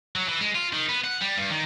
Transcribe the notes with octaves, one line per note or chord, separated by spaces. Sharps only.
F#3
E3
G#3
F4
D#3
B3
F#5
G3
G2
D#3